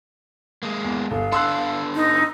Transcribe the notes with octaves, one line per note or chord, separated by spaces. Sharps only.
G#3 A#3
E2
G1 F5
B3 D4 A4 C6 E6 F#6
D#4